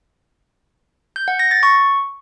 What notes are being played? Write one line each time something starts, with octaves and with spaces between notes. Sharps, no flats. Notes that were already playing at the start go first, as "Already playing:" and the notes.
G6
F#5
A#6
A6
C#6